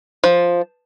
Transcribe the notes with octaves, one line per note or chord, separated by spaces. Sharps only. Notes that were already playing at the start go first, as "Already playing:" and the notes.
F3